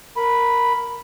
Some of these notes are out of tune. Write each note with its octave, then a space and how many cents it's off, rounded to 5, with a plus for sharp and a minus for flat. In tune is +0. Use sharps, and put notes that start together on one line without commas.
A#4 +0 B5 +0